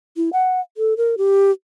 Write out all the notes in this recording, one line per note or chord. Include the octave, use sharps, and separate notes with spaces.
E4
F#5
A4
A#4
G4